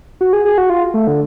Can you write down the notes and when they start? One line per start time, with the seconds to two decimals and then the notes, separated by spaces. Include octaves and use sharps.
0.21 F#4
0.33 G#4
0.45 G#4
0.58 F#4
0.70 F4
0.94 A3
1.07 D3